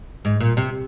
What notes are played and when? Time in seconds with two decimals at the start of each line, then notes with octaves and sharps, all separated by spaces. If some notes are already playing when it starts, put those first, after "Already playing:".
0.25 G#2
0.40 A#2
0.57 C3